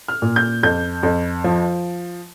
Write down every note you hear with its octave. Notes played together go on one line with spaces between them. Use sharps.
F6
A#2
G6
F2 G6
F2
F3